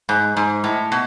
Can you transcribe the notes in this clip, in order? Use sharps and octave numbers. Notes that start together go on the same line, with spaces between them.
G#2
G#2
A2
B2